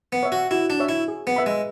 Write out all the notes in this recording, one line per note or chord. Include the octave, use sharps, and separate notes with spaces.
B3
C#5 E5
F#4
E4 F#4
D4
C#5 E5
E4
G#4
B3
B4 E5 B5
G#3